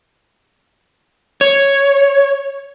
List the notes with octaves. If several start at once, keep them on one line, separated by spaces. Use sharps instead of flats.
C#5